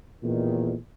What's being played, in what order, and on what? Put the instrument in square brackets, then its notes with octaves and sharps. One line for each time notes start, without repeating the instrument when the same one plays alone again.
[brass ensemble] A1 E2 D#3 [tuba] A#2